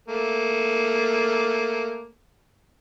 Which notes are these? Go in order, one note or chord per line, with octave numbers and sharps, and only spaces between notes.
A3 A#3